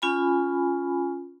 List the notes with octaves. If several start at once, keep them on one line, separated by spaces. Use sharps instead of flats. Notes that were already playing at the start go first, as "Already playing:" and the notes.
C#4 F4 G#5 B5